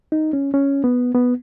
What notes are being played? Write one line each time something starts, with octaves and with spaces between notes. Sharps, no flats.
D#4
C#4
C#4
B3
B3